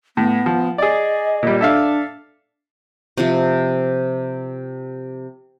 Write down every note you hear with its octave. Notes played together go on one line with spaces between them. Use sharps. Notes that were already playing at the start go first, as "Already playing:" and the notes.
A2 B3
F3
G#4 D5 D#5
A#2 G3
D4 A4 E5 F5
C3 F3